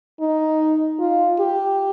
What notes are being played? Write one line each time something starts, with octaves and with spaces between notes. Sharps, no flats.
D#4
F4
G4